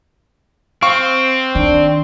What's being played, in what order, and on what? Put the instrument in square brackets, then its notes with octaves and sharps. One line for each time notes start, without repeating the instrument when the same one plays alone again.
[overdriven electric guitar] C4 [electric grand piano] F5 C#6
[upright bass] D#3 [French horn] D4